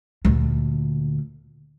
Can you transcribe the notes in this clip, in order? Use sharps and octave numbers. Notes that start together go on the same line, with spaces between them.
D2 A#2